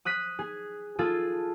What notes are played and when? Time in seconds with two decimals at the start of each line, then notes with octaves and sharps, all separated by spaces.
0.05 D#6 F#6 B6 D#7
0.39 G#4
0.99 F4 G#4 A4